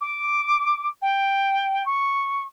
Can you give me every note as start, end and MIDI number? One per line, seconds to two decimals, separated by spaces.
0.01 0.88 86
1.01 1.83 79
1.85 2.43 85